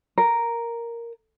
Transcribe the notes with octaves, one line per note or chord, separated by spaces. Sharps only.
A#4